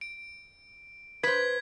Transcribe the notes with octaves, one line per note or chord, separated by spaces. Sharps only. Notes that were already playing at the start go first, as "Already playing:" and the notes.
D7
B4 C5 G#6 B6